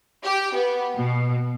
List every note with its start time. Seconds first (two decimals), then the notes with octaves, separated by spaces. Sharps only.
0.24 G4
0.54 B3
0.95 B2